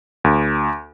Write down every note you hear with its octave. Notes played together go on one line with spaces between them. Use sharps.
D2